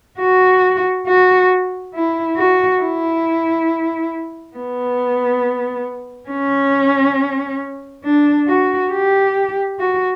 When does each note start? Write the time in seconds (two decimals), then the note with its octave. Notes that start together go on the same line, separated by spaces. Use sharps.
0.19 F#4
1.07 F#4
1.94 E4
2.37 F#4
2.81 E4
4.56 B3
6.29 C#4
8.04 D4
8.47 F#4
8.92 G4
9.79 F#4